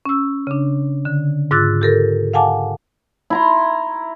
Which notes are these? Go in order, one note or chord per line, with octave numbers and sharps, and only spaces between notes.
C#4 E6
C#3 D4
D3
G#2 F4 D6 E6 F#6 A6
G4 A4 A#4
F5 F#5 G#5 A5 D6
E4 A#5 C6